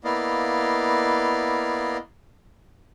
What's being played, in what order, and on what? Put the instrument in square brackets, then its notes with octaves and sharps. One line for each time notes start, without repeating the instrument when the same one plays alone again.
[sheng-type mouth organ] A#3 B3 E4 D5 D#5 F5